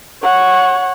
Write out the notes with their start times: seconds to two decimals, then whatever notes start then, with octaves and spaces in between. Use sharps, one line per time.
0.23 C#5 F#5